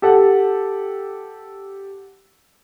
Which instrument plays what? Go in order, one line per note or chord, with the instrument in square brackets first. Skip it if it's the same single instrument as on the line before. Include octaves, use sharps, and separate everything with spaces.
[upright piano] G4 A4 F#5